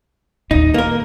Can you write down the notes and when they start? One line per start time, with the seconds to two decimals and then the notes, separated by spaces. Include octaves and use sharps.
0.51 D#2 A#2 D#4
0.74 A#3 A#4